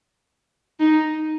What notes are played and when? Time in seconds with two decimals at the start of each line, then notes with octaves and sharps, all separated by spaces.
0.80 D#4